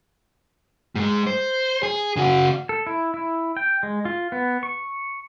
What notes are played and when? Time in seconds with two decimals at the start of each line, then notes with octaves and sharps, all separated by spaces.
0.96 G#2 G#3
1.27 C5
1.83 G#4
2.16 C#3 F#4
2.69 A4
2.87 E4
3.14 E4
3.57 G5
3.83 G#3
4.05 F4
4.32 B3
4.63 C#6